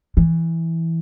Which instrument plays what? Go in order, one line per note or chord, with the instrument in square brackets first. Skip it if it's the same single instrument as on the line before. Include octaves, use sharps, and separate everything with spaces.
[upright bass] E3